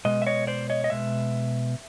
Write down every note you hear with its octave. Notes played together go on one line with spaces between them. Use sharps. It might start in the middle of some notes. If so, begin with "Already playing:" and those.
B2 G#3 D#5
E5
C#5 D#5
C5 D5
C#5 D#5
D#5
B2 G#3 E5